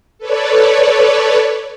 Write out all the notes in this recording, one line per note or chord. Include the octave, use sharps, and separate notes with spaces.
A4 B4 C#5 D5